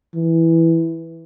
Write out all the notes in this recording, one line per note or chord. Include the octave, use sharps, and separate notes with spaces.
E3